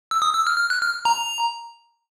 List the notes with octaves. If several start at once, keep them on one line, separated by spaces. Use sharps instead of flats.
E6
D#6
E6
F6
F6
F#6
F6
A#5